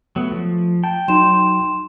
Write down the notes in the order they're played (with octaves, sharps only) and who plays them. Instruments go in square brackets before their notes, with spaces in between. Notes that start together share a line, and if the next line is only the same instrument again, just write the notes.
[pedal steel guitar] F#3 B3 [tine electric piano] A3
[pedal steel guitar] F3
[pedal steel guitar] G5 [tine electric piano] A5
[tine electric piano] F#3 D#4 [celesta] C6 E7